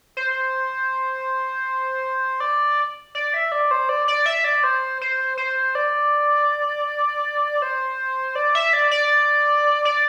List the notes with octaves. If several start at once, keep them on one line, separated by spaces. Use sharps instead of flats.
C5
D5
D5
E5
D5
C5
D5
D5
E5
D5
C5
C5
C5
D5
C5
D5
E5
D5
D5
D5